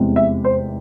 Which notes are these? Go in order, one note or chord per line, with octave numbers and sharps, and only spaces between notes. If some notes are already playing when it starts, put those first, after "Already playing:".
Already playing: F1 E2 C3 G#3
E5
C5